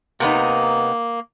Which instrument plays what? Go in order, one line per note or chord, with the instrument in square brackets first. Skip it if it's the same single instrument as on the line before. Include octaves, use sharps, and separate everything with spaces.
[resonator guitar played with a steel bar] C3 B3 D#4 [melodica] A#3